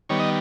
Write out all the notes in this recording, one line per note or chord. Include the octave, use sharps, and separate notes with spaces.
D#3 G3 B3 C#5
D#5